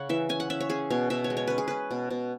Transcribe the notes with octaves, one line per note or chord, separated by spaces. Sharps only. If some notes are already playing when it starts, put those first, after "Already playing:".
Already playing: C#3 C#4 F#5
E3 E5
C#4 G#5
F#5
C#4 E5
C#5
C#4 G#4
B2 C#5
B2 E5
C#5
G#3
C#5
C#4 B4
G#4
C#4 B4
B2
B2